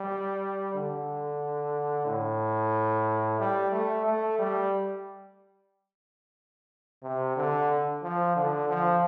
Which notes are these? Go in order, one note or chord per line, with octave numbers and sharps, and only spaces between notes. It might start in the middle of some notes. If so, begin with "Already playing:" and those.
Already playing: G3
D3
A2
G3
A3
A3
G3
C3
D3
F3
D3
F3